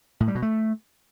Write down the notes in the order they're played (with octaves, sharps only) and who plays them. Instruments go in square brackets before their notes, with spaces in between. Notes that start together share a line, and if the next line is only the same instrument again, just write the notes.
[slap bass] A2
G3
B2
A3